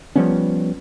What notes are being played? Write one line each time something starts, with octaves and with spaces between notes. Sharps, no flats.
F3 G3 B3 C#4